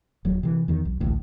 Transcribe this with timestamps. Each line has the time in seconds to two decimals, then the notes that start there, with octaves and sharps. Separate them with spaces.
0.25 D#1 F#3
0.43 C3 E3
0.68 E2 D#3
0.85 B1
1.00 A1 D2 A2